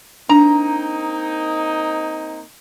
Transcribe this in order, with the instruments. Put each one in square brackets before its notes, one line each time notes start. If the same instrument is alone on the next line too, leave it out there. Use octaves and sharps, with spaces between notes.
[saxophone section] A#3 C4 D#4 [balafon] D4 [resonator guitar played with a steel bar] A#5